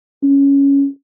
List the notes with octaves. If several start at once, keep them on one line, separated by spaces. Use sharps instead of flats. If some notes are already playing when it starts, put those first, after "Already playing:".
C#4